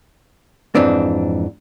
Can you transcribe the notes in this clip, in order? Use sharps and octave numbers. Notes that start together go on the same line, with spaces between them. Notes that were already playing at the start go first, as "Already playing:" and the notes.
F2 G#2 E3 C4 D4